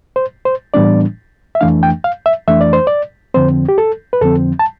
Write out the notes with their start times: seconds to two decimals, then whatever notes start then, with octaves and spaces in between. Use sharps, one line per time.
0.16 C5
0.45 C5
0.74 A2 E3 G3 B3 D4 D5
1.55 E5
1.61 F2 E3 A3 D4 F5
1.83 G5
2.04 F5
2.26 E5
2.47 F2 E3 A3 D4 E5
2.61 D5
2.73 C5
2.87 D5
3.34 F2 D3 F3 C4 C5
3.69 G4
3.78 A4
4.13 B4
4.21 F2 D3 F3 C4 A4
4.59 A5